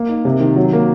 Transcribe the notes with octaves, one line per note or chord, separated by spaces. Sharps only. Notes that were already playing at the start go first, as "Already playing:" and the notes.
Already playing: A#3
D#4
C3
D#3
F#3
A#3